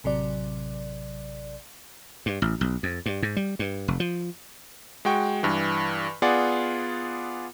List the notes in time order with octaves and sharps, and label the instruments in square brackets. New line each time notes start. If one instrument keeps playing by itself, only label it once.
[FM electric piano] A1 C3 F#3 D5
[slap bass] G2
A1
B1
F2
G2
G#2
G3
G2
F1
F3
[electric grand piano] G#3 F#4 G5 C#6
G2 E3
B3 F4 G#4 D5 F#5